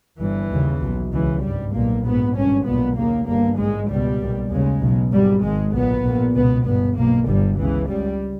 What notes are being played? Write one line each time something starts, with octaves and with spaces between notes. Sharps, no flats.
G1 G2 E3
D#2 C#3
B1 B2
C#2 C#3 E3
G#1 G2 G3
B1 A#2 A#3
A#1 G#2 B3
G#1 G2 C#4
B1 A#2 B3
D#2 C#3 A#3
G1 G2 A#3
A#1 G#2 G#3
C#2 B2 G3
B1 A#2
D#2 C#3 G#3
B1 B2
G#1 G#2 G3
G#1 G#2 G#3
B1 A#2 B3
A#1 A#2
C#2 B2 B3
G1 G2 B3
B1 B2 A#3
G1 G2 G3
C#2 C#3 E3
C#2 C#3 G3